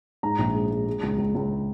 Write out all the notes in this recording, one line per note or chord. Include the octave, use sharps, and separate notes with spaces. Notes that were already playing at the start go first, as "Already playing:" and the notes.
G#2 A#5
A#1
G#3
G#3
G#3
C#2
C#2
C#2